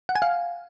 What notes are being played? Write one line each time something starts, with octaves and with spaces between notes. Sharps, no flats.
F#5
G#5
F5